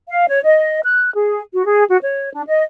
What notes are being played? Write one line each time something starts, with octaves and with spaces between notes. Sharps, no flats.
F5
C#5
D#5
F#6
G#4
F#4
G#4
F#4
C#5
D4
D#5